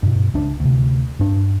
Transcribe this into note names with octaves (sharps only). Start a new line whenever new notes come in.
G2 B2
C#2 D4
D2 C3
G2 D4